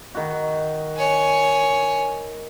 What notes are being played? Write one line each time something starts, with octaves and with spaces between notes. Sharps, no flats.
D#3 F#4
C#5 G#5